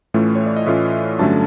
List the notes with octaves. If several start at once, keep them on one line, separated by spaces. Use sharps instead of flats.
A2 E3 A3 C#4 F4
C#5
D5
D#5
A2 E3 A3 C#4 F4 E5
G2 D3 F#3 A3 C#4 A5